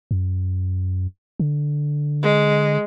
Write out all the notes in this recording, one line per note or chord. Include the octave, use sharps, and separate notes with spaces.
F#2
D3
G#3